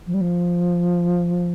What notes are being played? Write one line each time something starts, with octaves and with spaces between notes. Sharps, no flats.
F3
G3
F3